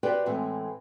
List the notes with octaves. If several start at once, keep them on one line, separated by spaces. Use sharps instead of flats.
F#4 G4 B4 C5 D5 G5
A2 E3 G#3 C4